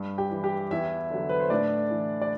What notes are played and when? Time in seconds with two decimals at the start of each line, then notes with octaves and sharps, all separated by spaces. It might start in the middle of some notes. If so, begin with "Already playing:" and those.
Already playing: G2
0.18 G4 G5
0.31 E3
0.44 G4 G5
0.71 E2 E4 E5
1.10 D3 F#3
1.29 B4
1.40 C5
1.50 A2 D4 D5
1.91 E3
2.22 D5